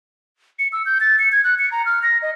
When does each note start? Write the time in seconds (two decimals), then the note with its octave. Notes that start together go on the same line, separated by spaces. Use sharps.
0.59 C#7
0.72 E6
0.86 G6
1.01 A6
1.19 C#7
1.32 G#6
1.44 F#6
1.59 C#7
1.72 A#5
1.86 F6
2.03 A#6
2.22 D#5